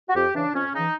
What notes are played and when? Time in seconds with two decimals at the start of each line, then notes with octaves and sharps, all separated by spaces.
0.09 F#4
0.16 F2 G4
0.35 C#3 E3 D4
0.54 F2 C#4
0.74 C#3 E3 D#4